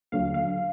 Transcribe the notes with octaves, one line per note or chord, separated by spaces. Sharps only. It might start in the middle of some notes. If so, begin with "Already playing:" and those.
D#2 D3 F#3 F5
F5